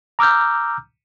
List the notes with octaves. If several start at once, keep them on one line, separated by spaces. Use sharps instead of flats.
A#5 D6 E6 F6 G6